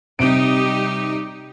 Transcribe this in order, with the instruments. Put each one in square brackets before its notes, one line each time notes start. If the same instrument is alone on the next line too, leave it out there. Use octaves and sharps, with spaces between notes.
[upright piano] C3 D7 [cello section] G3 D#4 G4